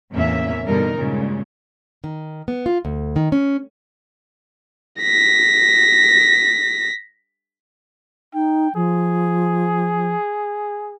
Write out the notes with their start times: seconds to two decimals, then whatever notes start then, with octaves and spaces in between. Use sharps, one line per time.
0.12 E2 A2 C3 A#3 C#4 E5
0.66 G2 B2 D3 G3 D#4 A#4
0.95 G2 A#2 C#3 G#3
2.04 D#3
2.48 B3
2.66 F4
2.85 D2
3.16 D#3
3.32 C#4
5.01 A#6 B6
8.34 D#4 G5
8.75 F3 G#4